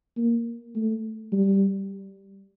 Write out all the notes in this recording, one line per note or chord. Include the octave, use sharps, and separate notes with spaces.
A#3
A3
G3